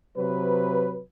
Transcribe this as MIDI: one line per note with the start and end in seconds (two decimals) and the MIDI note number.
0.17 0.99 48
0.17 0.99 54
0.17 0.99 71